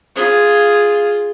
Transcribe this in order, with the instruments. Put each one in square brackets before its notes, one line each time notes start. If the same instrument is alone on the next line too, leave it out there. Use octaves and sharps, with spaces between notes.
[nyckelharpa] F4 G#4